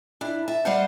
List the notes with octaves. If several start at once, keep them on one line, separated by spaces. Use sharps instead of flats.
D4 E4
E5 A5
G3 B4 C5 F5 F#5 A5